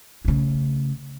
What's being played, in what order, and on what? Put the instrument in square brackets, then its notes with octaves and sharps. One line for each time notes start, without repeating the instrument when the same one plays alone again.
[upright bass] C#3 A3